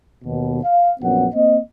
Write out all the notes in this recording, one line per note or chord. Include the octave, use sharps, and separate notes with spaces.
D#2 B2
F5
A#1 F#2 B3 C4 F#5
A#3 C4 D#5